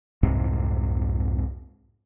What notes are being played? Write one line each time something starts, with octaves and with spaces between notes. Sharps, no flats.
C2 F2 G#2 C3